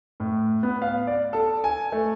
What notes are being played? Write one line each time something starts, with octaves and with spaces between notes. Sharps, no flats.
A2
B3
F5
D5
A4
G#5
A3